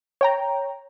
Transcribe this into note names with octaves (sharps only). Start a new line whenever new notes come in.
C#5 G5 A#5